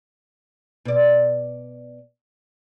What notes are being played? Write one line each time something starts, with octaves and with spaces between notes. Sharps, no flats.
B2 D5